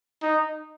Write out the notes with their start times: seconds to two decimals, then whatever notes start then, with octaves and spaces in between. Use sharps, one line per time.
0.23 D#4